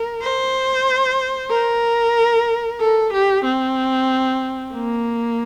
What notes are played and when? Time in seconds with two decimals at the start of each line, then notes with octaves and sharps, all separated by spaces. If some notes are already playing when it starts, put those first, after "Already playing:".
Already playing: A#4
0.22 C5
1.50 A#4
2.80 A4
3.12 G4
3.44 C4
4.73 A#3